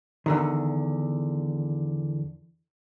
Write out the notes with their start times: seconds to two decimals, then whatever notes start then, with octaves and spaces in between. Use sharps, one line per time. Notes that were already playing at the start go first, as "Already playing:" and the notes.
0.26 E2 D3 D#3